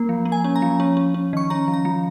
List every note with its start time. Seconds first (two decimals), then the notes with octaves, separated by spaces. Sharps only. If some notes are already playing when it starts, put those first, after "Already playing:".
Already playing: A#3
0.09 F3
0.25 A#3
0.32 G#5
0.44 C#4
0.56 A#5
0.62 F3
0.80 C#4
0.97 C#4
1.14 C#4
1.33 D#3 C#6
1.50 C#4 A#5
1.68 F3
1.74 A#5
1.85 F3